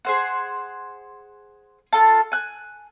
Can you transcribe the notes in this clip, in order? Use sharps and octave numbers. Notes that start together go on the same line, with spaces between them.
G#4 C5 F#5
F4 A4 A5
G#5 F#6